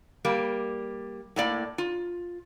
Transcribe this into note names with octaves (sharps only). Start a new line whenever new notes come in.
G3 A#3
A2 A#3 D5
F4